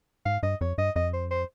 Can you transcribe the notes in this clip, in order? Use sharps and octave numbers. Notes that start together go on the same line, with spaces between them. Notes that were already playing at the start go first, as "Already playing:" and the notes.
G#2 F5
G2 D#5
F2 C#5
G2 D#5
F2 D#5
C5
C5